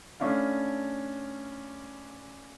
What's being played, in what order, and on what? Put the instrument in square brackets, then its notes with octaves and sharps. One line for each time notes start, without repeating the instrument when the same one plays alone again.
[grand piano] A3 C#4 D4 E4 F5